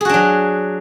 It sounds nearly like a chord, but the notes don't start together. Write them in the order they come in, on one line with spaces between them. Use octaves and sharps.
G#4 F#4 D4 F#3